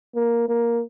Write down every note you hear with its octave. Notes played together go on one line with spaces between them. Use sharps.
A#3
A#3